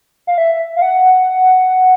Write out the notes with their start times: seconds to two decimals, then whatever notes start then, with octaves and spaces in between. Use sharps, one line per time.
0.27 F5
0.38 E5
0.76 F5
0.82 F#5